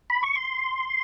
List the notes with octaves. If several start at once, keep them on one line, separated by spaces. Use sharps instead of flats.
B5
C#6
C6